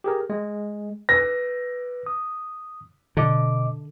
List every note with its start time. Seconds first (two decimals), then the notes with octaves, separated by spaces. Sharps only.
0.04 G4 G#4 A#4
0.30 G#3
1.09 B4 A#6
2.06 D#6
3.17 B2 D3 D#5 D6